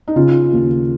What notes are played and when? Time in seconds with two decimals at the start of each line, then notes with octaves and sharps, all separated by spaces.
0.08 D#4
0.16 C#3 F4
0.52 D#2